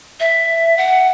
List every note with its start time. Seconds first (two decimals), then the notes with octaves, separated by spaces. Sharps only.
0.20 E5
0.77 F#5